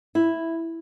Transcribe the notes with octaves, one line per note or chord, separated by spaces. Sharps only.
E4